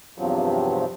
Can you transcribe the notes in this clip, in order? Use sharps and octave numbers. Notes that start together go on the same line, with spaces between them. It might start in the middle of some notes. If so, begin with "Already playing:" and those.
E2 G2 C3 F3 F#3